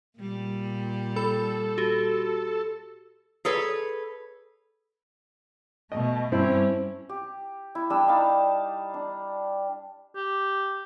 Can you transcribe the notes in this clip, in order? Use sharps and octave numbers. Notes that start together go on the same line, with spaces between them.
A#2 G3
A4 B5
F#4 G4
G#4 A4 B4 C#5
B2 A3 D#5
G2 C4 C#4 E4
G4
E4
G3 D4 E6
D#4 F5 A5
D4
G4